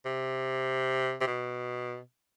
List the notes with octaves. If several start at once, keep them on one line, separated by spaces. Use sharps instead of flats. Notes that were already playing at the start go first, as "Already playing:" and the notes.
C3
C3
B2